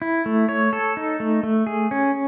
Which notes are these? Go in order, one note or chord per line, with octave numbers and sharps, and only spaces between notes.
E4
A3
C#5
A4
D#4
A3
A3
G#4
C#4